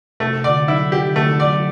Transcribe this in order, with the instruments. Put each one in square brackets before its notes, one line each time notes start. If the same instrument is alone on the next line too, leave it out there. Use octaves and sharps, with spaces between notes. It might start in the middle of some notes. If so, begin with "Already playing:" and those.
[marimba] C3 [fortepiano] A3
[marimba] D3 [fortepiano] D5
[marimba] F#3 [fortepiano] E4
[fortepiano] G4
[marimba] D3
[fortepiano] A3
[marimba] E3
[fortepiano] D5
[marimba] F#3